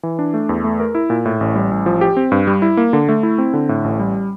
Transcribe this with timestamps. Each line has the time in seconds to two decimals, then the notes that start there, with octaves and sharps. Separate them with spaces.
0.03 E3
0.19 D4
0.34 A3
0.49 E2
0.64 A3
0.80 A#4
0.95 E4
1.10 A#2
1.25 A2
1.41 A1
1.56 G3
1.71 A1
1.86 F3
2.01 G4
2.17 C4
2.32 G2
2.47 G3
2.62 E4
2.77 A#3
2.93 D3
3.09 A3
3.23 E4
3.38 C4
3.53 D3
3.69 A2
3.84 A1
3.99 G3